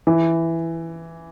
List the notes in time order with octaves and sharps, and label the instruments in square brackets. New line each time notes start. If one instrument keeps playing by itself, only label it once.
[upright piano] E3